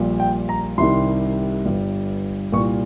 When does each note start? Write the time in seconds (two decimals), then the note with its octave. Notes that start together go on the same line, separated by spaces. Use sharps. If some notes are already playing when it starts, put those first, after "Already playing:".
Already playing: A#1 A#2 G3
0.20 G5
0.49 A#5
0.78 C2 C3 D#3 G3 C6
1.65 G1 G2 G3
2.52 C2 A#2 G3 C#6